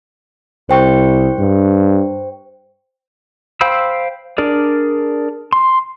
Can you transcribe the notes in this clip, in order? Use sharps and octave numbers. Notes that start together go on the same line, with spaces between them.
C2 C5 G5 C#6
G2
C5 F5 G5 B5 E6
D4 G#4 A#4 D5
C6